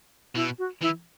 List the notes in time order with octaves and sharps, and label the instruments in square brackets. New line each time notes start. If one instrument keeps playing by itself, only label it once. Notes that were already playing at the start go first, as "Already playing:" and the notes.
[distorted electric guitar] B2 [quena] E4
[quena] F#4
[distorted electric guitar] E3 [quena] E4